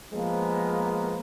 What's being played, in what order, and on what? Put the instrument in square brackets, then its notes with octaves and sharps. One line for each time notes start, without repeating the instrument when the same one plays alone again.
[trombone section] F3 G#3 A#3 B3